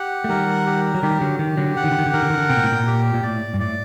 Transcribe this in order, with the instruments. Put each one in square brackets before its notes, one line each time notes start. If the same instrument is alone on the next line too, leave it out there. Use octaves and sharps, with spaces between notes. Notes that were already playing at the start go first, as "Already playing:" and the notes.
Already playing: [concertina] G4 F#5
[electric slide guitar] A3
[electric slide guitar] D#3 G3 [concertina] A#4
[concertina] G4
[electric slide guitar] F#3
[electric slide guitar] D#3 G3 [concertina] G4
[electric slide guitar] D3 F#3
[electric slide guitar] D#3 [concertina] G4
[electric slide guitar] D3 F#3
[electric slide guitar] D3 [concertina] F#5
[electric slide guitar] D#3
D3
D#3
D3
[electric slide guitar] D#3 [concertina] A#4
[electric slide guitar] D3
D#3
D3
[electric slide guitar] C3 [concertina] G5
[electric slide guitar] A#2
A2
A#2
[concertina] G4
[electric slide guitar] A#2
[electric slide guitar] A2 [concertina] D5
[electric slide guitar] G2
[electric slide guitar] A2 [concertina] D5